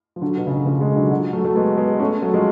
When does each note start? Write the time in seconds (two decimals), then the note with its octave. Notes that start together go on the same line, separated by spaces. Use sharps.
0.16 F3
0.22 D3 F#3
0.37 B2
0.47 C#3
0.56 D3
0.66 C#3 F3
0.81 F3 G#3
0.96 D3 F#3
1.11 D3 F#3
1.33 F#3 A3
1.44 F#3 A3
1.56 G#3 B3
1.77 G#3 B3
2.00 A3 C#4
2.22 F#3 A3
2.34 F3 G#3